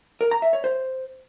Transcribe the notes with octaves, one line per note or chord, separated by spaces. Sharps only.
A#4
A#5
E5
C#5
C5